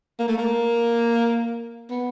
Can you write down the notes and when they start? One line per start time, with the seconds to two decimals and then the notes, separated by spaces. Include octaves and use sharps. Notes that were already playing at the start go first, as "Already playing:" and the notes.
0.19 A#3
0.28 A3
0.38 A#3
1.90 B3